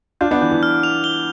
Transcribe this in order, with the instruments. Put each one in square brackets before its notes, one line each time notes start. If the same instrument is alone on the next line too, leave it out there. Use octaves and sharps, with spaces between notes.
[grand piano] D4 F4 [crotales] G6
[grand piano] B3 D4
[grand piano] E3 [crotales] G6
[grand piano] E3
[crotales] F6
F7
G7